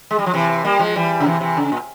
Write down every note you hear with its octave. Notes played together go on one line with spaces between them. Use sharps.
G#3
G3
F3
C3 E3
G3 A#3
F3 G#3
E3 G3
C#3
C3 E3
C3 E3
C#3
A#2